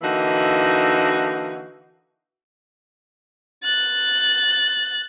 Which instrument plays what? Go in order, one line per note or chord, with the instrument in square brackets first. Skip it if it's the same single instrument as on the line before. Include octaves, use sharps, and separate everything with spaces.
[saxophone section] D3 E3 A#3 D#4 F#4
[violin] F#6 A6